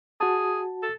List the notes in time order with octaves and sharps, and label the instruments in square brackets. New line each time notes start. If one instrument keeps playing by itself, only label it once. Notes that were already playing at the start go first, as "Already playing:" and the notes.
[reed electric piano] F#4 A5 [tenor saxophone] G#4
[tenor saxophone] A4